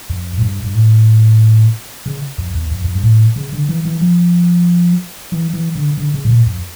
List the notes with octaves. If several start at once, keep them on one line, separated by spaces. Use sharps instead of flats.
F2
A2
G2
G2
A2
C#3
F2
E2
F2
F2
G2
A2
C#3
D3
E3
E3
F3
E3
E3
D3
D3
C#3
A2
A#2
F2